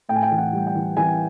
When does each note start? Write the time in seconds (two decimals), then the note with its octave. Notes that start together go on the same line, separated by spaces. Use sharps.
0.09 A2 G5
0.16 G#5
0.23 G5
0.31 E3
0.38 F#5
0.53 G3
0.67 G5
0.75 E3
0.97 E3 G#5